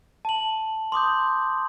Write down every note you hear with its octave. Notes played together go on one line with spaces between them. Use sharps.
A5 F#7
C6 D6 D#6 G6